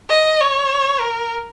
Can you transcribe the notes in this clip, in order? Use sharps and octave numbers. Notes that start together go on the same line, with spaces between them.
D#5
C#5
A#4